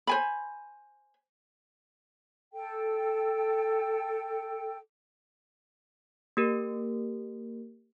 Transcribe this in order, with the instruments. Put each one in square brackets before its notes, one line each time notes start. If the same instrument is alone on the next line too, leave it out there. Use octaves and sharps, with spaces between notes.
[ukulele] C5 G#5 B5
[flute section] A4 G5
[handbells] A#3 G4 A#4